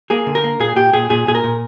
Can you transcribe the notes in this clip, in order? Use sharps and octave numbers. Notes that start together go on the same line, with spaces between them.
A#3 G#4
D3
A#4
A#3
A#2 G#4
A#2 G4
A#2 G#4
A#2 G#4
A#2 G#4
A#4
A#2